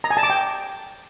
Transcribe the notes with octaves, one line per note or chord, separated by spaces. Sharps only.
A#5
G#5
A5
D6
G5